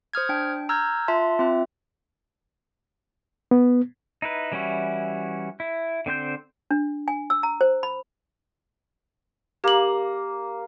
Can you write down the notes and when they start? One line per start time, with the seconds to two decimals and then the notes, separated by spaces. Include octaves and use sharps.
0.14 C5 D#6 F6 G#6
0.29 D4 G5
0.69 A#5 E6 F6 G6 G#6
1.08 F4 E5 A5 C6
1.39 C4 F4 E5
3.51 B3
4.22 D#4 E4 B4
4.52 E3 G3 C#4 E4 F#4
5.60 E4
6.06 D3 C4 C5 G6
6.71 D4
7.08 G#5
7.30 E6
7.43 A#5
7.61 C5
7.83 B5
9.64 A#3 G4 F#7